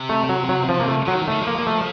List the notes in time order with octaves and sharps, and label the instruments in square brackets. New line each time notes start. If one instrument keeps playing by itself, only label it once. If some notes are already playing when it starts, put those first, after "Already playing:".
Already playing: [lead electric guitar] C3
[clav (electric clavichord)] A3
F#3
F#3
F3
A#3
A3
[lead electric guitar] F3 [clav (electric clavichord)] F#3
[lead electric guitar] D#3
[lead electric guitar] D#3 [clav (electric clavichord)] A3
[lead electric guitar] F3
[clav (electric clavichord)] A#3
A#3
A3